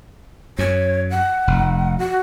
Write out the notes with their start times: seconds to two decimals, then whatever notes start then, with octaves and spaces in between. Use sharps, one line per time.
0.59 F#2 C#5
1.11 F#5
1.47 F1
1.99 F#4